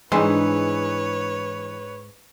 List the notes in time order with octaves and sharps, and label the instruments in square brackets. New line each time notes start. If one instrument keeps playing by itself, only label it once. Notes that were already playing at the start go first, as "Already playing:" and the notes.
[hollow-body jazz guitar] G#2 C6 [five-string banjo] E3 D#4 [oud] G#3 D4 [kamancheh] B4 C#5